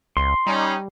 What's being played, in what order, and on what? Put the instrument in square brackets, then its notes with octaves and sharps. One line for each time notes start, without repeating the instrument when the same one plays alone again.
[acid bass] C#2 [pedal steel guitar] C6
[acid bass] G3 [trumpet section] C#4 D#4